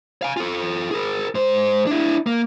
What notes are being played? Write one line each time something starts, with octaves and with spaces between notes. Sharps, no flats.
F5 G#5
F4 A4
G#4 A#4
G#2 C5
D4 E4
A#3